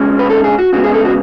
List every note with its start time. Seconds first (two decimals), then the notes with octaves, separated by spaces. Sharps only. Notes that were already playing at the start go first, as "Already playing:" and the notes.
Already playing: B2 G#3 C#4
0.19 B4
0.30 A4
0.44 G#4
0.59 F#4
0.73 C#3 G#3 B3 F#4
0.84 G#4
0.94 A4
1.05 F#4